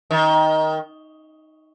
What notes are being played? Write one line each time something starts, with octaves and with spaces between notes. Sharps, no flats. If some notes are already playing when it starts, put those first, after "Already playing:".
D#3